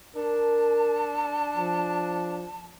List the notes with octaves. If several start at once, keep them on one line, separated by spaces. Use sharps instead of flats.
D4 A#4 A5
F3